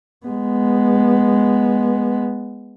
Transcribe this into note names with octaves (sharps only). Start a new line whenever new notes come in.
G#3 B3